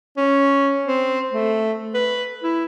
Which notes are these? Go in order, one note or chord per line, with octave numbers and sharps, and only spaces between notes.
C#4
C4
A3
B4
E4